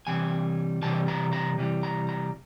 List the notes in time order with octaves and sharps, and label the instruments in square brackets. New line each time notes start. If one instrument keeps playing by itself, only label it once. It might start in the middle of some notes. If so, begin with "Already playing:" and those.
[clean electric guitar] C3 E3 G3 G#5
C3 E3 G3 A5
A#5
A#5
C3 E3 G3
A#5
A#5